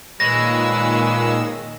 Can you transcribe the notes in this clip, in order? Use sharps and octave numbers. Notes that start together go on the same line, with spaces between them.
A#2 D#3 G#3 B4 C#5 E6 A#6